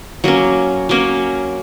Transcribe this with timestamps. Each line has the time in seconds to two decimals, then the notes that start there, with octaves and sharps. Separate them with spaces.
0.24 F#3 A#3 C#4
0.89 F#3 A#3 C#4